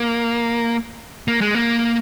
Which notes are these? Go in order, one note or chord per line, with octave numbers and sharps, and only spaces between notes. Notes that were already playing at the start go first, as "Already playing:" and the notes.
Already playing: A#3
A#3
G#3
A#3